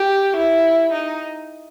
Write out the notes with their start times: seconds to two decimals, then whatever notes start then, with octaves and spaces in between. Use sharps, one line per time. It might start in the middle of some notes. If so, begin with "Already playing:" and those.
Already playing: G4
0.37 E4
0.93 D#4